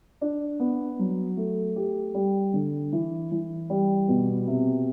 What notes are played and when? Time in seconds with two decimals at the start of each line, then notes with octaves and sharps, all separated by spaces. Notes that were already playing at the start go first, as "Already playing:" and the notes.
0.21 D4
0.60 B3
0.99 F#3
1.37 A3
1.76 G4
2.14 G3
2.53 D3
2.92 E3
3.31 E3
3.70 G3
4.08 B2
4.47 C3